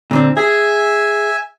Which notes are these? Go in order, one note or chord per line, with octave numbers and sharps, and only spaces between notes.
A#2 D3 C4
G#4 E5 G#5